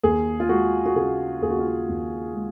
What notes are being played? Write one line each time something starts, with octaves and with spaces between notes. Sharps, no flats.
D#2 G#4
F4
G#3 F#4
F#4
C#3 G#4
D#2 G#4
F#4
F4
F#4
D#2
G#3